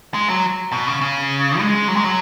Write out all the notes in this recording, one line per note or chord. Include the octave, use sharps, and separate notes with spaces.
G#3
F#3
B2
C#3
C#3
G#3
F#3
G#3
F#3